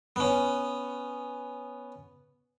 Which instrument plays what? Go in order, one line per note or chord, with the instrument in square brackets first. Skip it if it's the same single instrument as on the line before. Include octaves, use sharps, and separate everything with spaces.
[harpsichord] B3 C#4